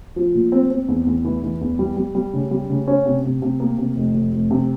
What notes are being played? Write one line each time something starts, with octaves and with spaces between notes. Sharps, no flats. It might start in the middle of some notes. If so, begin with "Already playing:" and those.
F3
A#2
C4
C4
E2
E2
E3
E3
E2
G3
G3
G3
C#3
G3
C#3
C#4
C3
C3
C3
A#3
C3
F1
F1
F1
C3